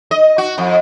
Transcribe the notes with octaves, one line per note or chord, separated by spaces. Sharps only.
D#5
F#4
F2